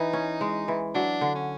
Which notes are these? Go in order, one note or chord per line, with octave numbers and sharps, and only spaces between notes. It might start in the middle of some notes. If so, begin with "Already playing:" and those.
Already playing: E3 D#4
C#4
G#3
E3
F#3 D4
D3
C#4